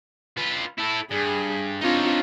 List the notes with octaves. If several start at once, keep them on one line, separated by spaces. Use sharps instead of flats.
F4 B4
E4 A4
G2 G#4
C4 D4 D#4 F4 C#5